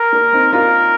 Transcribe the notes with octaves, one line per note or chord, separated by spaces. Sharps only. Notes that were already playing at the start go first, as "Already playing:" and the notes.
Already playing: A#4
A#3 D4
C4 D#4
D4 F4 A#4